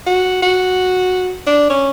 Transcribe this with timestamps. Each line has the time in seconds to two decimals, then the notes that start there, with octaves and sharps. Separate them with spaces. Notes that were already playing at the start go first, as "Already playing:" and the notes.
0.06 F#4
0.42 F#4
1.47 D4
1.70 C#4